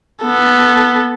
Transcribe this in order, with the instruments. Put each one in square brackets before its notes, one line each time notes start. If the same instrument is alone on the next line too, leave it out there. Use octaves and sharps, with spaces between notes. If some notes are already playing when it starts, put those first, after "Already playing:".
[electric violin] B3 A4